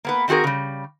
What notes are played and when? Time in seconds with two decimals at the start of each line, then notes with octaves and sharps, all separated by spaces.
0.05 A#3 B3 B4
0.28 D#3 C4 F#4 G#4 A#4
0.44 C#3 G3